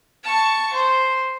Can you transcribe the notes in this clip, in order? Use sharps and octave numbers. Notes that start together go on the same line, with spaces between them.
A5 C#6
C5